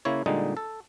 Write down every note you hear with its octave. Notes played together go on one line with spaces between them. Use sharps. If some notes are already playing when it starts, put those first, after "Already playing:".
C#3 A#3 E4 C#5
A#2 D3 G3 G#3 D#4
A4